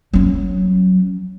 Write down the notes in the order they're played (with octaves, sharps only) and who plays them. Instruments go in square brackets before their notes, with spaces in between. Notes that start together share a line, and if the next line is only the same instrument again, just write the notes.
[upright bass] F#3 C#4